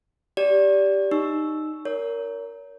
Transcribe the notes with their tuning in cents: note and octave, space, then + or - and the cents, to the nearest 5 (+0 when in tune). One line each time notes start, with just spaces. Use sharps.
G4 +0 D5 -20
D#4 -10 C#6 +0 E6 +0
A#4 +0 C#5 +35